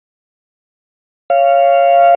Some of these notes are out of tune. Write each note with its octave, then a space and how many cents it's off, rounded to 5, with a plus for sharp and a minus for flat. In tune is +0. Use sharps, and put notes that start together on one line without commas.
C#5 +0 F5 -15